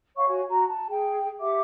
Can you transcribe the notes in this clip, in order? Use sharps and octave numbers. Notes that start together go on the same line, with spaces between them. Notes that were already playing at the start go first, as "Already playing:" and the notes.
C#5 F5 F#5 C#6
F#4 C#5 G#5
F#4 A#5
A5
G#4 G5
G4 E5 F#5 D6